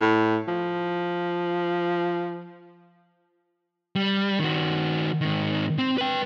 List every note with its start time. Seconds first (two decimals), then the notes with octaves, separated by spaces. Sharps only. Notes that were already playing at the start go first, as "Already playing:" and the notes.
0.01 A2
0.48 F3
3.96 G3
4.39 D#3 F#4
5.21 G#2 D#3
5.78 C4
5.98 B4 G5